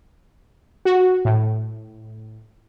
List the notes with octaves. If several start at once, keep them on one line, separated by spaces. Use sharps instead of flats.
F#4
A2